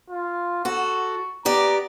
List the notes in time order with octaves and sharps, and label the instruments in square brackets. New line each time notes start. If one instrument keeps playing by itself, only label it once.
[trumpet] F4
[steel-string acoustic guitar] F#4 A4 [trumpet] C#6
[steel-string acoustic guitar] B3 G4 D5 [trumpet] A#5